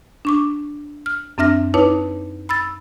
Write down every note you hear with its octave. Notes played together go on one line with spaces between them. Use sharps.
D4 C#6 D6
F6
F#2 C4 D4 E5 F6 A#6
D#4 E4 B4 C#5 A5 D6
B5 E6 A6